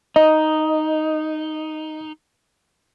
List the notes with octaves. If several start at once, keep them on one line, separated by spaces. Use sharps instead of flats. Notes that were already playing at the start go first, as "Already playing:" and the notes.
D#4 D#5